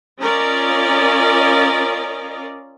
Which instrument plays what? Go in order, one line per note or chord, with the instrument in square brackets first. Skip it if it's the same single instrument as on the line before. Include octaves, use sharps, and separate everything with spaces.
[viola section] C#4 F4 A#4 D5 D#5